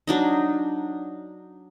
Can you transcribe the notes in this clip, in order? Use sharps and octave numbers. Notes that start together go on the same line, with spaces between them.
F#3 D4 D#4